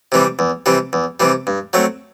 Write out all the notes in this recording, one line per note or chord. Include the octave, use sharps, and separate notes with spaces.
C3 E3 G3
E2
C3 E3 G3
E2
C3 E3 G3
G2
F#3 A3 C4